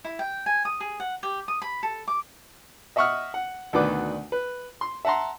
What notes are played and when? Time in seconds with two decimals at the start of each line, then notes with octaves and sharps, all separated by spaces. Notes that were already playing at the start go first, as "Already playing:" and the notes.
0.04 E4
0.19 G5
0.46 G#5
0.65 D#6
0.80 G#4
1.00 F#5
1.23 G4
1.48 D#6
1.62 B5
1.83 A4
2.08 D6
2.96 D#5 E5 F#5 C#6 D#6 F6
3.34 F#5
3.73 D2 B2 D#3 D4 B4 D6
4.32 B4
4.81 C6
5.05 E5 F#5 A5 A#5 C6